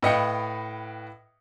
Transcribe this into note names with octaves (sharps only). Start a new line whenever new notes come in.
A2 B4 D#5 F5 G5 C#7